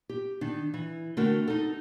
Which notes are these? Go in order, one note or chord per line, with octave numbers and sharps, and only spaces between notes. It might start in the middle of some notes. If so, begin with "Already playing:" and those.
G4
D#3 D4
E3
D3 A3 F#4 A#4 G5
D#4 A4